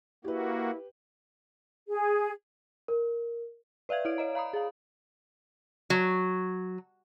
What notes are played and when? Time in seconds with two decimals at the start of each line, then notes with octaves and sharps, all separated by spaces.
0.24 A#3 E4 F#4 G4 B4
1.89 G#4
2.88 A#4
3.89 B4 D5 E5 F5 G#6
4.05 E4 C#5 D7
4.18 C#5 D#5 A#5
4.35 F5 A#5 B5 D#6
4.53 G#4 F5
5.90 F#3